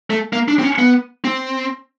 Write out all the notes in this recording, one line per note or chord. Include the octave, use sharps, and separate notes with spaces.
A3
A#3
D4
C4
C#4
B3
C4